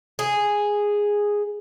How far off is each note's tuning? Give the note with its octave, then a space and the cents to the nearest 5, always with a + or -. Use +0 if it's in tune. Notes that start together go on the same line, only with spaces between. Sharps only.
G#4 -5